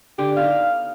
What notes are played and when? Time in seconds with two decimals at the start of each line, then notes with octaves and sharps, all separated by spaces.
0.19 D3 G4
0.37 B3 D#4 F5